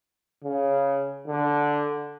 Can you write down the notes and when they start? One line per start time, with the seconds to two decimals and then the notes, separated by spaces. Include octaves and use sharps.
0.44 C#3
1.28 D3